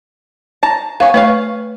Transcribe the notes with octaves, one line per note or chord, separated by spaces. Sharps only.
A5 A#5
B3 C#5 F5 G#5
A3 B4 C#5 F5